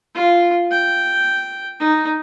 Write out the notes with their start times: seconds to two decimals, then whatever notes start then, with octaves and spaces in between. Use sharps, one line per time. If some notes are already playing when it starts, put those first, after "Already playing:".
0.15 F4
0.71 G5
1.80 D#4